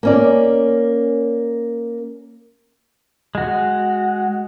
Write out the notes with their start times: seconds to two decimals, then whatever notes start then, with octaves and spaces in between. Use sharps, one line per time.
0.03 A#3 C#4 D5
3.35 G#3 F#4